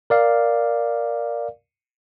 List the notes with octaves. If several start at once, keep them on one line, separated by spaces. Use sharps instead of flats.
A#4 D5 F5